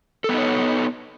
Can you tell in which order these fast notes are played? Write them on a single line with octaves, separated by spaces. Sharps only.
A4 B3 D#4 C#5